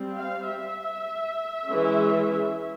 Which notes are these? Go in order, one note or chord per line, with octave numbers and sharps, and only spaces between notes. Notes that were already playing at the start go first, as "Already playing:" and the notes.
Already playing: G3 C4
F5
E5
E3 G#3 C#4